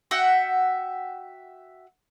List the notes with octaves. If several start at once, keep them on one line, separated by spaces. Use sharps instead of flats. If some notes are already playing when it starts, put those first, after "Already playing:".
F#4 E5 F#5 G5